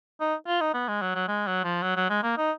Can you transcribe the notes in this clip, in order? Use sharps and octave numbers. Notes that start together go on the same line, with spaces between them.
D#4
F4
D#4
B3
G#3
F#3
F#3
G#3
F#3
F3
F#3
F#3
G#3
A#3
D#4